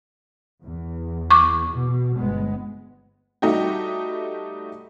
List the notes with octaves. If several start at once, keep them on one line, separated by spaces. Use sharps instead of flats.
E2
C#6 D6
B2
G1 G#3 B3
G3 A3 D#4 F#4 G4